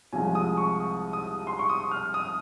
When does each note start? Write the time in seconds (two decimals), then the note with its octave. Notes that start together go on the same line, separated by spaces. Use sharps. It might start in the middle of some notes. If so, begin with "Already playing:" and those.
0.13 C2 C3 F3 G#3 G#5
0.35 D#6
0.57 C#6
0.80 D#6
1.13 D#6
1.47 C6
1.59 C#6
1.69 D#6
1.91 F6
2.14 D#6